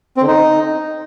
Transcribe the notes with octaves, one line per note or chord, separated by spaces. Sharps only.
C4
D3
D#4